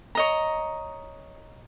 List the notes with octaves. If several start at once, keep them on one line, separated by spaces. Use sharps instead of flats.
C#5 D#5 A#5